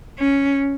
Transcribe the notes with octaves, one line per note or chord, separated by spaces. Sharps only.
C#4